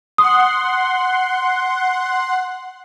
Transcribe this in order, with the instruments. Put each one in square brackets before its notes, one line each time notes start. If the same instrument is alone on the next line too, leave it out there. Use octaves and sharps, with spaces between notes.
[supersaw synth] F#5 C6 [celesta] D#6